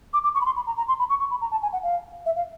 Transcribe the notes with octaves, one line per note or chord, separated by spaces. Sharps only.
D6
D6
C#6
B5
C6
B5
A#5
A#5
C6
B5
C#6
C#6
B5
A#5
A5
G#5
F#5
F5
E5
F5